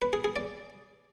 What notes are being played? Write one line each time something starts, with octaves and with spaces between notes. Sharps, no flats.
B4
G#4
G#4
D5